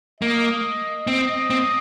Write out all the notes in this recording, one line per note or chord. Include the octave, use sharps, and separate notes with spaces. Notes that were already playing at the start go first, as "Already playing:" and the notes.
A#3 D#5
C4 D#5
C4